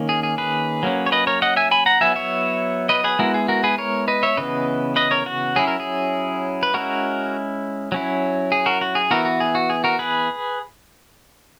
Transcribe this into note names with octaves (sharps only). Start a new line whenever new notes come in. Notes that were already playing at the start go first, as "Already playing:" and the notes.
Already playing: D#3 A#3 C#4
G#4
G#4
G#4 B4
F#3 A#3 C#4
C#5
B4 D#5
A#4 C#5
D#5 F#5
E5 G#5
G#5 B5
F#5 A#5
F#3 B3 E4 E5 G#5
C#5 E5
B4 D#5
G#4 B4
G#3 B3 E4 F#4 A#4
G#4
F#4 A#4
G#4 B4
A#4 C#5
B4 D#5
C#5 E5
C#3 E3 B3 B4 D#5
B4 D#5
A#4 C#5
F#4
F#3 C#4 E4 G#4
A#4
G#4
B4
G#3 C#4 E4 F#4 A#4
F#3 C#4 E4
G#4
F#4 A#4
F#4
G#4
E3 B3 E4 F#4 A#4
F#4
G#4
F#4
G#4
F#4 A#4
G#4 B4